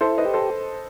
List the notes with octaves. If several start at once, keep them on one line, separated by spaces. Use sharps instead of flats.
E4 A4 C5
B4 D#5
G4
A4 C5